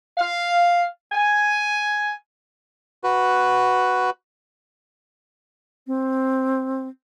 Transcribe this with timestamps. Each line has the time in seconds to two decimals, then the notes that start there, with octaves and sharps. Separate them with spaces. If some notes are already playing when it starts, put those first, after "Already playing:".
0.17 F5
1.12 G#5
3.04 F#4 B4
5.87 C4